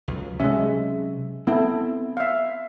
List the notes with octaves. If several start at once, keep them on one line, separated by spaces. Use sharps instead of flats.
C#2 F#3
C3 F#3 G#3 C#4 E5
B3 C4 E4 A4
E5 F5